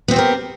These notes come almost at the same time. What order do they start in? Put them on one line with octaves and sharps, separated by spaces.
B3 C4 C5 G4 A#4